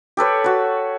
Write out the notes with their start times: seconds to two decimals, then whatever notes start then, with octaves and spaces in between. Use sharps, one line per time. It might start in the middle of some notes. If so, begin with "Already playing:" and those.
0.17 G4 A4 B4 C#5
0.44 F#4 B4